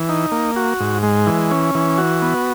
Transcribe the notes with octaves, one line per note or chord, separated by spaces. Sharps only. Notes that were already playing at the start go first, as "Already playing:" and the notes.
Already playing: E3
D#4
A#3
F#4
G#2
G#3
E3
C#4
E3
F#4
B3